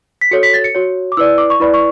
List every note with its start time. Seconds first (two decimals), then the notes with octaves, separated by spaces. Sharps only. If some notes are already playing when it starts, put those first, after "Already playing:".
0.21 B6
0.31 F#4 A4 C#5 C#7
0.43 B6
0.54 A6
0.64 C#7
0.75 F#4 C#5
1.12 D6
1.17 E4 B4 D5 E6
1.38 D6
1.50 C#6
1.60 E4 B4 D5 B5
1.74 C#6